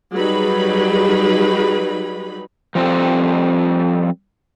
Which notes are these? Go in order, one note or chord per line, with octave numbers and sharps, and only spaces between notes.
F#3 G3 D#4 G#4 B4 B5
F3 G3 C4 A4